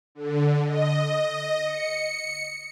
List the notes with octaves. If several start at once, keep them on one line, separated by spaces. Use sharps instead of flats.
D3
D#5
C#7